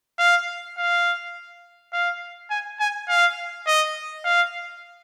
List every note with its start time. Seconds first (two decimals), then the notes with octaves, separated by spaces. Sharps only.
0.19 F5
0.77 F5
1.93 F5
2.50 G#5
2.80 G#5
3.08 F5
3.67 D#5
4.24 F5